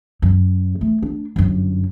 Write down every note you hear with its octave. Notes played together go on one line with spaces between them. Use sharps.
F#2
A3
D4
G1 F#2